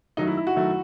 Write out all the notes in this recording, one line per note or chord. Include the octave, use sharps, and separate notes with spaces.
D#3 F#3 A3 D#4
E4
E4
F#4
D#3 F#3 A3